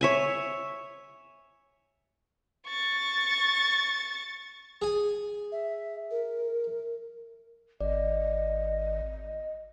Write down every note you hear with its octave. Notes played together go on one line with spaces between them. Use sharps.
C#5 E5 G#5
C#6 A6
G#4 G#5
E5
A#4
G#1 D5 D#5